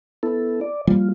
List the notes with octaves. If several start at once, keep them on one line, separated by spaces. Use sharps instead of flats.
B3 E4 A4
D5
F3 G3 A#3 F4